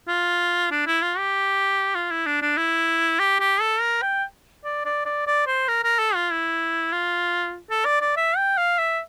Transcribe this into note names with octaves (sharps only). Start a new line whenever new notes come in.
F4
D4
E4
F4
G4
F4
E4
D4
D4
E4
G4
G4
A4
A#4
G5
D5
D5
D5
D5
C5
A#4
A#4
A4
F4
E4
F4
A4
D5
D5
E5
G5
F5
E5